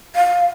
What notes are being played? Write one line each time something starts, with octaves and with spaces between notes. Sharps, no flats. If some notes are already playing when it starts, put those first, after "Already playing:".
F5